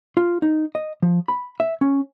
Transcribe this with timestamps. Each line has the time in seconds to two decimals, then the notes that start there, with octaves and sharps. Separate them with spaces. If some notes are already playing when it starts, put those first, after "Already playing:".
0.17 F4
0.42 D#4
0.75 D#5
1.02 F3
1.28 B5
1.60 E5
1.81 C#4